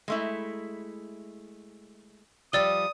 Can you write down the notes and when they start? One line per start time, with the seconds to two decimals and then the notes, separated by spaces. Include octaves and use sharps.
0.08 G#3 A3 E4
2.53 F3 G3 D5 D#6 E6 G7